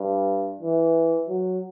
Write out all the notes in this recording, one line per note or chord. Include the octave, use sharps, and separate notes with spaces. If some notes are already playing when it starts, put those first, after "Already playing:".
Already playing: G2
E3
F#3